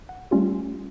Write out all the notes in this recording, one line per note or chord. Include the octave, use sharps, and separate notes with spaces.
F#5
G3 A3 C#4 F4 G4